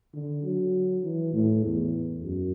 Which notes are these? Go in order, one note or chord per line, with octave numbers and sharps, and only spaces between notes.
D3
F#3
E3
A2
E2
F#2